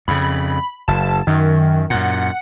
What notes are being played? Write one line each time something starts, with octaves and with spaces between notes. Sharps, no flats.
F2 C#3 B5
F#1 A5
F#2 D#3
F#2 A#2 F#5